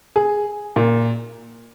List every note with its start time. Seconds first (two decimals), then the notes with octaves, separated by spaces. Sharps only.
0.16 G#4
0.76 A#2